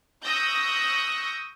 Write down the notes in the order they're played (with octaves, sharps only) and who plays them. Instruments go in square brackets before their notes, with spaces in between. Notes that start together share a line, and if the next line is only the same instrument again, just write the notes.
[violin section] C#6 D#6 E6 F#6 G6 A#6